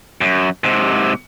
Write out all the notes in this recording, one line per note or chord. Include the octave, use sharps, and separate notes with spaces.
F#2
G#2 C3